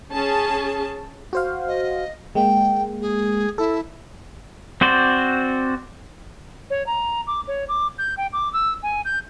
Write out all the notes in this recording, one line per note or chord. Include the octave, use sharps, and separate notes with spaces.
C#4 G#4 A5
F#4 C5 F5
D#5
G#3 A#3 G5
G#4
E4 A4
C4 F#4 C5 D5
C#5
A#5
D6
C#5
D6
G6
G5
D6
E6
G#5
G6